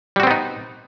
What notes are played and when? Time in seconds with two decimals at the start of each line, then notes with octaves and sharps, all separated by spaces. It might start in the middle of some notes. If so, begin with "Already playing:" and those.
0.16 G3
0.20 F#4
0.23 C4
0.27 B3
0.31 D#4